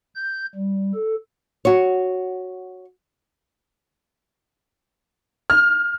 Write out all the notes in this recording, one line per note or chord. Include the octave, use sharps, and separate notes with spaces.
G6
G3
A4
F#4 C#5
F6